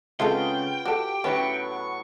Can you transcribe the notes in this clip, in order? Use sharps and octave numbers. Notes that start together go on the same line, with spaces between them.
C#3 G#3 B3 C4 F4 A4 G5
F#4 G4 A4
A2 F#3 B3 C#4 G4 C#6